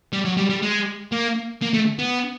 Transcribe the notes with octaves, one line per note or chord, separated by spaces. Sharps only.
G3
F#3
G3
G3
G#3
A#3
A#3
A3
B3